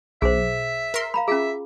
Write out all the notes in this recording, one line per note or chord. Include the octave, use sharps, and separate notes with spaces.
B1 G#4 C5 E5
A#4 C6
F5 A#5 B5
C#4 F4 G#4 E5